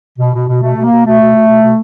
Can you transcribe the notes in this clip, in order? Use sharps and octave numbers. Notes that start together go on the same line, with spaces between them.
B2
B2
B2
B2 A3
B2
A#3
B2
B2 A3
B2
B2
B2
B2